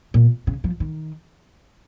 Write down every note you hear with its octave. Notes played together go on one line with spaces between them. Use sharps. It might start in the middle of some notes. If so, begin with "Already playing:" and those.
A#2
C#3
F3
D#3